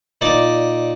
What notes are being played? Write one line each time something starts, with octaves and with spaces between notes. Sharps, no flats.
A#2 D#4 D5 D6